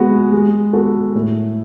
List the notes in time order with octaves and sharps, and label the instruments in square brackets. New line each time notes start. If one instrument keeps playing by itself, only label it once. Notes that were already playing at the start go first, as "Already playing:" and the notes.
Already playing: [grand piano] G#3 B3 F#4
G#3
B3 F#4 A4
A2